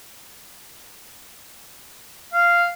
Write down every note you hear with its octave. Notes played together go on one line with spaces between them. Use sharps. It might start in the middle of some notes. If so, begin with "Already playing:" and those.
F5